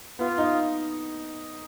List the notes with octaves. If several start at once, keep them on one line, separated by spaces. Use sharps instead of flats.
B3 F4
D#4